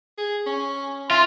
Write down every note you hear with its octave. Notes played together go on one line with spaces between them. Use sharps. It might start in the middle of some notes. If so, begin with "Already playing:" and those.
G#4
C#4
F4 E5 C6